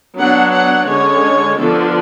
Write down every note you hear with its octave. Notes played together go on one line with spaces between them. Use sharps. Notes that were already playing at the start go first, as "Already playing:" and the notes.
F#3 B3 D4 F#5
F#5
D3 G#3 C#4 C#5
D3 F3 B3 D4 A4